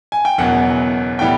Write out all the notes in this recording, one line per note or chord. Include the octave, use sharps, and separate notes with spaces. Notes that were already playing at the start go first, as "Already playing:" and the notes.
G#5
G5
F#1 E2 B2 F#3 F#5
A2 E3 G3 B3 G5